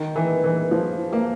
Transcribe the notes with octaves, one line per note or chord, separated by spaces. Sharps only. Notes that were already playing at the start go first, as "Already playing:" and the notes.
Already playing: D#3
E3
E3
F3
A#3